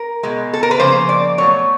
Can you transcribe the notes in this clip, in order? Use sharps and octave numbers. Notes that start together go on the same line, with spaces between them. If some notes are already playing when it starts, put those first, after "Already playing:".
Already playing: A#4
B2 G#3
A4
A#4
B4
C#3 F3 A#3 C5
D5
B2 F#3 A3 C#5